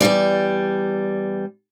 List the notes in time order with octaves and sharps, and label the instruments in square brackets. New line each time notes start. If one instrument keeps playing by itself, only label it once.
[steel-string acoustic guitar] E2 B2 G3 D5